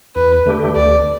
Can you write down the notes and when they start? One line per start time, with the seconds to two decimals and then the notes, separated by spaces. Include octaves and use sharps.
0.16 E2 B4
0.46 D3 A3 G4
0.75 D2 D5